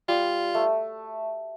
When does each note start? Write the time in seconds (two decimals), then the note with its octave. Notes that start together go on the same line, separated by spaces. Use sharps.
0.08 G3 F4
0.54 A3